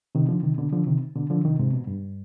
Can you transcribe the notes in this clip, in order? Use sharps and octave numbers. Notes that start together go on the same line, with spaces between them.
C3 D#3
D3 F3
C3 D#3
B2 D3
D3 F3
C3 D#3
B2 D3
D3 F3
C3 D#3
G#2 C3
B2
G2